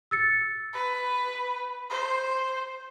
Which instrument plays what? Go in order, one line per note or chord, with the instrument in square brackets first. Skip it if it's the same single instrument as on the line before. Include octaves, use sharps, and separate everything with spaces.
[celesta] E6 A6 C#7
[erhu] B4
C5